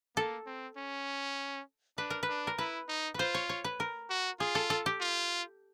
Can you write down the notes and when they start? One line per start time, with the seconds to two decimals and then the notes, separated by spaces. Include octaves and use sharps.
0.16 A#3 A4
0.46 C4
0.77 C#4
1.98 D4 B4
2.10 A#4
2.23 B4
2.29 D4
2.47 A#4
2.58 E4 B4
2.88 D#4
3.14 F4 B4 C5
3.34 C#5
3.49 C#5
3.64 B4
3.80 A#4
4.10 F#4
4.40 F4 G#4
4.55 A4
4.70 A4
4.86 G4
5.00 F4